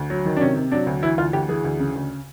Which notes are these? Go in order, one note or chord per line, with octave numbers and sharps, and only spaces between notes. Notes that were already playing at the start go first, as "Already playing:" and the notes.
Already playing: D2
F#3
D#3
D4
C3 C#4
C3
F#3 D4
D2
E3 E4
D2 F4
D2 G4
E3 G#4
D2
C#3
D2